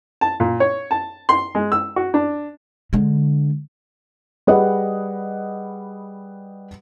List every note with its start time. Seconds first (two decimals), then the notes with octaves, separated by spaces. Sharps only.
0.21 A5
0.40 A#2
0.60 C#5
0.91 A5
1.29 C6
1.55 G#3
1.72 E6
1.96 F#4
2.14 D4
2.93 D3 G#3
4.47 G3 G#4 B4 D#5 F#5